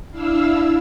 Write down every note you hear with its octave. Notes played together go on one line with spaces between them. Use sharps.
D4 E4 F5 E6